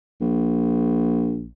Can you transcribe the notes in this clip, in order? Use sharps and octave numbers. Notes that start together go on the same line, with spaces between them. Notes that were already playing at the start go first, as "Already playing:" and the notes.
A#1